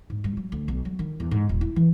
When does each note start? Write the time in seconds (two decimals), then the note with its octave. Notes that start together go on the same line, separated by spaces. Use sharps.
0.10 G#2
0.24 G2
0.37 F#3
0.52 D2
0.68 B1
0.85 F#3
0.99 D#3
1.20 E2
1.31 G#2
1.49 D#1
1.61 E4
1.76 E3